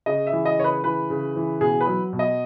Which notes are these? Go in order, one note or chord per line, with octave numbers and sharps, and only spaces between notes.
C#3 D#5
E5
E3
D#5
C#3 C#5
B4
E3 B4
C#3
E3
B2 G#4
B4
F#3
B2
D#5